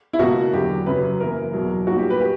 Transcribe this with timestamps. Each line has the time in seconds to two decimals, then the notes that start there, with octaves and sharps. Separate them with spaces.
0.13 E4
0.19 C#2 B2 A#3 F#4
0.53 E2 D3 F#3 G4
0.86 F#2 C#3 F#3 B4
1.20 F#2 E3 A#3 A#4
1.53 E2 B2 F#3
1.87 B1 A#2 G3 A#3 F#4
1.98 G4
2.10 B4
2.20 G4